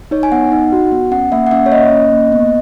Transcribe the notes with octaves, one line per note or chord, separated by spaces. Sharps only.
D#4 C#5
G#5
B3 F#5
D#4
F#4
B3
C#4 F#5
A#3 E5
F#5
C#4 E5
C#5
A#3 D#5
C#4
A#3
B3